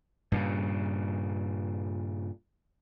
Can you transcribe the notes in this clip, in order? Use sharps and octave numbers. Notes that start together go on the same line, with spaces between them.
G2 A#2 C#3